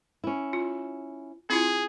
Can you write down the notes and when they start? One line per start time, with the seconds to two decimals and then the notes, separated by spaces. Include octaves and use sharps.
0.24 C#4 E4
0.53 F4
1.50 C4 E4 F4 G#4